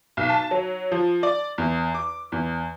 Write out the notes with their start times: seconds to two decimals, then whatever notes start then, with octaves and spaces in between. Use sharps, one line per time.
0.17 B1
0.29 A5
0.51 F#3
0.92 F3
1.23 D5
1.58 E2
1.95 D6
2.32 E2